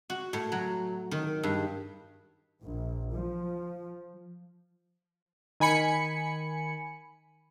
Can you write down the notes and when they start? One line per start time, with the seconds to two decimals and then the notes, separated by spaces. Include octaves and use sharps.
0.10 F#4
0.33 A2
0.52 F#3
1.11 D#3
1.43 G2
2.63 A#1
3.11 F3
5.60 D#3 G#5 B5 C#7